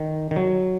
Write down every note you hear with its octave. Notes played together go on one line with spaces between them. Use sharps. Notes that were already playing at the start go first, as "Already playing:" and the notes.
Already playing: D#3
D#3
F#3